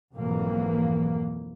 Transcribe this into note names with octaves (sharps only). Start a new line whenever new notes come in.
B1 F2 G#2 E3 A#3